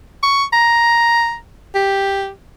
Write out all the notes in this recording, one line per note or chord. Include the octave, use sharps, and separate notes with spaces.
C#6
A#5
G4